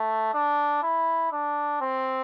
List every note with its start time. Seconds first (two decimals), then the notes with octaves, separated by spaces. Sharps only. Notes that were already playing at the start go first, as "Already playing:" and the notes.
Already playing: A3
0.34 D4
0.83 E4
1.32 D4
1.81 C4